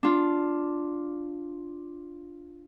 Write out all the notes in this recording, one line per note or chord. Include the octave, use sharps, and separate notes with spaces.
D4 F4